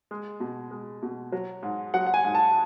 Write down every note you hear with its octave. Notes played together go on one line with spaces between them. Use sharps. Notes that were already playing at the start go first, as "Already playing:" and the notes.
G#3
B2
G#3
B2
F#3
G#2
F#3 F#5
F#5
G#5
G#2
A5